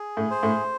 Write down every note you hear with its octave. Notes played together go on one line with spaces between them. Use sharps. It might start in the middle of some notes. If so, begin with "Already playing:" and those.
Already playing: G#4
A2
C5
A2